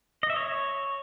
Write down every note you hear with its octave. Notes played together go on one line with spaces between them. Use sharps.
D#5
E5
C#5